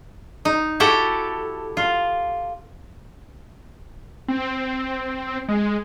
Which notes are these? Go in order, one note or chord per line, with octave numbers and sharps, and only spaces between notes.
D#4
E4 F#4 G4 A4 F#5 G5
F4
C4
G#3